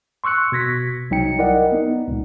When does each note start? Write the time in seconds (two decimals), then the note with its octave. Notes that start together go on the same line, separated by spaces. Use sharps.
0.24 C6 C#6 E6 F#6 C#7
0.52 B2 G#6 A#6 B6
1.11 C2 F#3 D#4 G5 C#7
1.39 E4 A#4 D5 D#5 F#5
1.72 B3 D#4
2.08 C#2 A#2